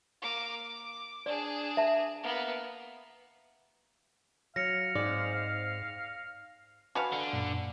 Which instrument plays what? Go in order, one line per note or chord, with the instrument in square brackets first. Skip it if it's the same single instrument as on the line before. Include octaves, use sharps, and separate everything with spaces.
[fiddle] A#3 D6
D6
[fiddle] D4 G#4 [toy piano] D5
[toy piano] E5 A5
[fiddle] A#3 B3
[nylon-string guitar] F#3 [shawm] F5 [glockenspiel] A#6 C#7
[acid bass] G#2 [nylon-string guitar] C4 D5
[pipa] F#4 B4 F5 [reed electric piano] G#5 A5
[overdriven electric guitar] D3
[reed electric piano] F#2 A#2